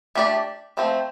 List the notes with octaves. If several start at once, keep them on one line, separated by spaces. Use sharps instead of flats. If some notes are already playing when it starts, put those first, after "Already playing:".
A3 D4 G4 D5
F3 A3 C4